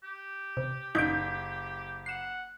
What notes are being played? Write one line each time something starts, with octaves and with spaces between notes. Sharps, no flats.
G4
C3
F#1 D#4 G6 D7
F#5 C7 E7